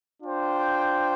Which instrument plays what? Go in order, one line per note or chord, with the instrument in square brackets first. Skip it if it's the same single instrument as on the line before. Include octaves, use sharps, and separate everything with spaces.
[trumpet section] D4 F4 C5 G5